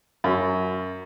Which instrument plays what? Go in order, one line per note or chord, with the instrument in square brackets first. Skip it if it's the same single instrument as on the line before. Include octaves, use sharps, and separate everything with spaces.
[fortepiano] F#2